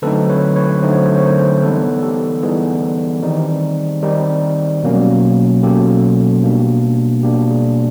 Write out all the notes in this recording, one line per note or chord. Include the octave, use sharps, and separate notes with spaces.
D3 F#3 A3 C4 D#4 A4 B4
B4 C#5
B4 C#5
D3 F#3 A3 C4 D#4 C5
C#5
C5
C#5
A#4 C5
E3 G3 B3 D#4 A4 B4
G4 A4
E3 G3 B3 D#4 G#4
D#3 G3 C4 D#4
D#3 G3 C4 D#4
B2 F#3 A#3 C#4
B2 F#3 A#3 C#4 G4 A4
B2 G3 A#3 D4
B2 G3 A#3 D4 G4
G#4